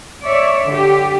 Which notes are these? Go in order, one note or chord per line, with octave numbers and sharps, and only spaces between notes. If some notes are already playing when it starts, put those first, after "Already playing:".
C#5 D5 E5
D3 G4